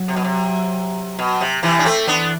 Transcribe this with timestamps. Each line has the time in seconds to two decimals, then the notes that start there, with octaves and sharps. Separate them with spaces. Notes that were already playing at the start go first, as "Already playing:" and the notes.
Already playing: F#3
0.08 C3
0.16 B2
0.24 C3
1.19 B2
1.41 C3
1.63 C3 E3
1.79 D4
1.85 A3 C4
2.07 E3 B3 D4